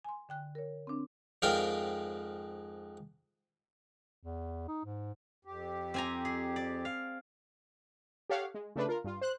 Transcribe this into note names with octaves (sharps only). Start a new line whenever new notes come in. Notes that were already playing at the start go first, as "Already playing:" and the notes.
G#5 C6
D3 G5 F#6
A#4 C#5
C4 D4
F2 G#2 A#4 D5 F5 G5
E2
D#4
G#2
F2 G4
C4 G#5 A#5
G#4
D5
F5
G4 A4 C#5 F5 F#5
G#3
C#3 A3 D4 B4
F4 A#4
G2 F4
C5 F#6